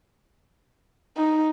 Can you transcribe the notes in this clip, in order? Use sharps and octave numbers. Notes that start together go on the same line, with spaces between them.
D#4